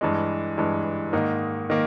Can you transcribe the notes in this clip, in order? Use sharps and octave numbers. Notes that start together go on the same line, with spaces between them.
G2 E3 G#3
G2 E3 G#3
G#2 D#3 A#3 D#4
D#3 A#3